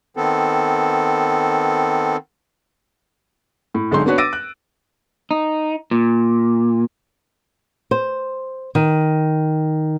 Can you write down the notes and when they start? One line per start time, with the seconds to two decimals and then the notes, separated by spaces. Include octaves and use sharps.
0.17 D#3 B3 C4 A4
3.74 A2
3.91 B1 D3 G#3 D#4 C6
4.06 B3 D4 F#4 B4 C#5
4.18 D6 E6 A6 A#6 D7 D#7
4.33 F#6
5.31 D#4
5.91 A#2
7.91 C5
8.75 D#3